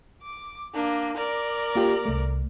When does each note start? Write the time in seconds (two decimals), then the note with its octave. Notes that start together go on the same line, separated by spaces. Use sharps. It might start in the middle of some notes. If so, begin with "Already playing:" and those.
0.23 D6
0.74 A#3 D4
1.17 A#4 D5
1.75 A#3 F4 G4
2.06 C2 A3